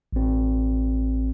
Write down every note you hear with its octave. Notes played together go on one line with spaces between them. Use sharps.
A1 C4